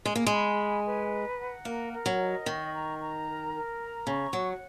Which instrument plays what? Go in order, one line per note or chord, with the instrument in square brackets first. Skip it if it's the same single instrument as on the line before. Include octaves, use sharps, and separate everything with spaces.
[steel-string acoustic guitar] G#3 [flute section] G#4
[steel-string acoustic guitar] A#3
G#3
[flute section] B5
G#5
B4
A#5
F#5
[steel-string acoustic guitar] A#3 [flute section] A#4
[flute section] A#4
[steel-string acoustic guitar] F#3
[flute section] D#5
[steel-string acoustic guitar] D#3 [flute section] C#6
[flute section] A#5
A#5
A#4
A#4
A#5
[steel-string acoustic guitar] C#3 [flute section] C#6
[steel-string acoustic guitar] F#3 [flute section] F#5